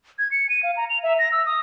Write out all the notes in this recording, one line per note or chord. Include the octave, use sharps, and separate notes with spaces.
G#6
C#7
D#7
F5
A#5
F7
E5
A#6
E6
D#6